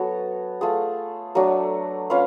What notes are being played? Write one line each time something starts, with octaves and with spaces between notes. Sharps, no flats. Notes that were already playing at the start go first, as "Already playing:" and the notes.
Already playing: F#3 B3 F#4 A4 C#5
A3 F4 G#4
F#3 A3 D4 F#4
C#4 F4 B4 F5